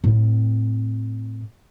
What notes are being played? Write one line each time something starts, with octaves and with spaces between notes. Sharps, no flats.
A2 C4